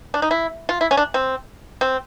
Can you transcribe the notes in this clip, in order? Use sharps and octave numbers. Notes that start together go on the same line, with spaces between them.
D4
D#4
E4
F4
E4
C#4
D4
C4
C4